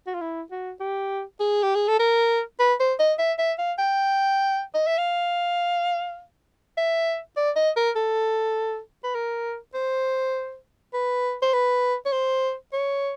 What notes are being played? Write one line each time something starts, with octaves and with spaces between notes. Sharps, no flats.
F#4
F4
E4
F#4
G4
G#4
G4
G#4
A4
A#4
B4
C5
D#5
E5
E5
F5
G5
D#5
E5
F5
E5
D5
D#5
A#4
A4
B4
A#4
C5
B4
C5
B4
C#5
C5
C#5